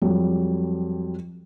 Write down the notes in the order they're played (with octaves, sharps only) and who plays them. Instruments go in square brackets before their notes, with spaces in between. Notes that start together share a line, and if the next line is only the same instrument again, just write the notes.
[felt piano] F2 F#3 G3